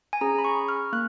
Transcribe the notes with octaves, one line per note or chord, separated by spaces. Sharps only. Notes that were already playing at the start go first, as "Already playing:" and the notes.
G#5
C#4 G#4 A#5
B5
C#6
F6
A#3 F#6